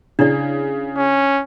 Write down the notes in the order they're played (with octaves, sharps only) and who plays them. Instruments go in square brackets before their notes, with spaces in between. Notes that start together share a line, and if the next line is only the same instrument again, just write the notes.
[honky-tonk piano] C#3 [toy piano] D4 E4 D5
[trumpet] C#4